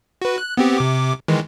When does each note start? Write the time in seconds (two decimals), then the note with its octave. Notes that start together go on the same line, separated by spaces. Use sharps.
0.22 F#4 B4
0.38 F#6
0.57 B3 C4 G4
0.78 C3 D6
1.28 D#3 E3 G#3